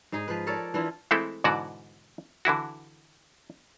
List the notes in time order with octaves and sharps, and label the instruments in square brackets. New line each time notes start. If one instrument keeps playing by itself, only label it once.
[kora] G#2 D#4 G#4
F3 B4
A4 A#4 C#5 D5
E3 D4 E4 F4
[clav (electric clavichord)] E3 G#3 A3 C4 E4 A4
G#2 B2 D3 E3 F#4 D5
D3 E3 E4 F#4